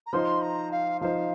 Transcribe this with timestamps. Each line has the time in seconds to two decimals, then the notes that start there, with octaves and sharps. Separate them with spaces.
0.06 A#5
0.13 F3 D#4 C5 C6
0.42 A#5
0.71 F5
1.01 F3 D#4 C5 F5